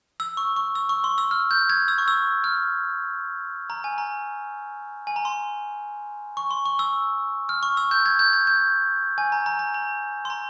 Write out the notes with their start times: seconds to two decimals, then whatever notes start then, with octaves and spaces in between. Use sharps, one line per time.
0.20 E6
0.37 C#6
0.56 C#6
0.75 E6
0.89 C#6
1.04 C6
1.18 E6
1.31 F6
1.51 G6
1.70 G#6
1.88 E6
1.98 C#6
2.08 E6
2.44 F6
3.70 A#5
3.84 G#5
3.98 A#5
5.07 G#5
5.16 A#5
5.25 C6
6.37 C#6
6.51 C6
6.66 C#6
6.79 E6
7.49 F6
7.63 C#6
7.77 E6
7.91 G6
8.06 G#6
8.19 G6
8.33 G#6
8.47 G6
9.18 G#5
9.32 A#5
9.46 A#5
9.59 A#5
9.74 A#5
10.25 C6
10.30 A#5